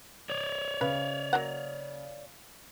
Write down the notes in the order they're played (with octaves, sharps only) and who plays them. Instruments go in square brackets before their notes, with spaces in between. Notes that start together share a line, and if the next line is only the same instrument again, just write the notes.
[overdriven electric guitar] C#5 D5
[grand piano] C#3 [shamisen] B4
[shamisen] F#3 A#3 F#5